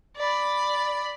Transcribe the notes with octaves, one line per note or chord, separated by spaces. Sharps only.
D5 B5